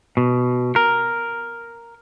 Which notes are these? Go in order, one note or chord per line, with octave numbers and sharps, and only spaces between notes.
B2
A#4